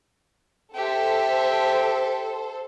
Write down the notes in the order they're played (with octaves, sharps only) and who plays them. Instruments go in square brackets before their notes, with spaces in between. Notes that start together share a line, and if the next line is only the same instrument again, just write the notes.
[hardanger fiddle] G4 E5 [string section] A4 C5